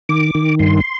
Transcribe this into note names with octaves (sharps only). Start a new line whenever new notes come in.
D#3 D6
D#3
G2 C6